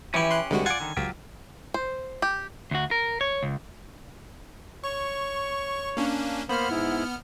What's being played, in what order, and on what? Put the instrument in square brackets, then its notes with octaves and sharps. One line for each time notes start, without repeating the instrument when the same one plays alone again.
[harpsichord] E3 E4 [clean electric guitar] C#4 G4
[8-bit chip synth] C6 F#6
[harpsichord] C2 [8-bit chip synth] D3 G#3 F#4
[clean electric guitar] F4 D5 [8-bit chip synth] F#5 [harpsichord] G#5
[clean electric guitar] D3 D#3
[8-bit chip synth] C#2 [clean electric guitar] F#3 F4 G4
[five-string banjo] C5
G4
[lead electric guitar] D2 F#4
A#4
C#5
C#2
[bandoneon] C#5 [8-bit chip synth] C#6
[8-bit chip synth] A#3 C#4 D4
[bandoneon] A#3 C5 B5 [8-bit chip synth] B3 F6
[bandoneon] G#2 E4